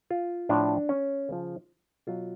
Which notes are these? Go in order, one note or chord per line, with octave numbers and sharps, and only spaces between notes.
F4
A2 F3 D4
C#4
C#3 F3
B2 F#3 F4